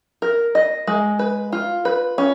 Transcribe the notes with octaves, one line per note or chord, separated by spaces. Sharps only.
A#4
D#5
G#3
B4
F4
B4
C#4